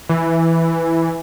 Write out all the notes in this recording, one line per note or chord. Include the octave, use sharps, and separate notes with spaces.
E3